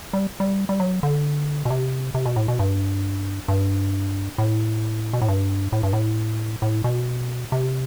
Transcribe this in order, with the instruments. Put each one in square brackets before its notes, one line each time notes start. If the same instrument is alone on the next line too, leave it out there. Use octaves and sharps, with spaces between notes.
[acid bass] G3
G3
G3
F#3
D3
B2
C3
C3
B2
A2
B2
G2
G2
A2
B2
A2
G2
A2
G2
A2
A2
B2
C3